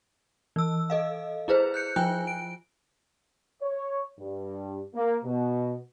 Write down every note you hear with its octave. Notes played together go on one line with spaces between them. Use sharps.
E3 E6
A4 D#5 F5
E4 G#4 B4 C5
F#6 G6 C#7
F3 F4 G5 G#5 F#6
D7
C#5
G2
A#3
B2